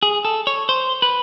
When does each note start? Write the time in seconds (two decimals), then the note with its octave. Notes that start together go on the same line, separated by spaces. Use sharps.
0.03 G#4
0.25 A4
0.47 C#5
0.69 C5
1.02 B4